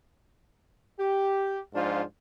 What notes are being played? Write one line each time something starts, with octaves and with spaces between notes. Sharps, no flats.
G4
G#2 F3 D4 F4